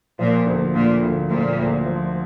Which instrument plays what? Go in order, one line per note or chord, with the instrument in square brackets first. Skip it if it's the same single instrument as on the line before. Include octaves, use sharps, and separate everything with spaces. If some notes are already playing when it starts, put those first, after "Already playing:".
[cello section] A#2 [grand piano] F3
[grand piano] D2
[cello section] A#2 [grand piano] D3
[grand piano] D2
[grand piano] D2 [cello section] A#2
[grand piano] D2
F3